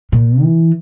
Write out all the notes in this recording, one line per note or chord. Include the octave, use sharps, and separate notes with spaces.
A#2
E3